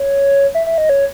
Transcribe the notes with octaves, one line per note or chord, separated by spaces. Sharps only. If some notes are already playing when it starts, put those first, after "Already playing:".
Already playing: C#5
E5
E5
D#5
C#5